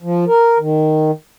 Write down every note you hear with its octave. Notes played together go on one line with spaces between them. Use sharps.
F3
A#4
D#3